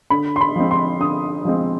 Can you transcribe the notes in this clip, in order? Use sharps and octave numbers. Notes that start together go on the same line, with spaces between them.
D3 B5
C6
B5
F3 G#3 C4
C6
D3 D#6
F3 G#3 C4